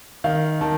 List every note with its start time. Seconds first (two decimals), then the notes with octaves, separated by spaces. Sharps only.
0.24 D#3 F5
0.61 D#3 A5